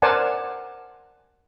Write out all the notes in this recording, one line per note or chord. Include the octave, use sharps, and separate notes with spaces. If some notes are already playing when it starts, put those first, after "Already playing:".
A#4 C5 D5 F#5 G#5 A5